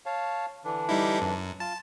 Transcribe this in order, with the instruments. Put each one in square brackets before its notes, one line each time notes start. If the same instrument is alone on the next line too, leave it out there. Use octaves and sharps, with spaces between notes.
[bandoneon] C#5 F5 A5
D3 E3 D4
[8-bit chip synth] G3 D#4 E4
F#2
[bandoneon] F4 [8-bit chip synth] A5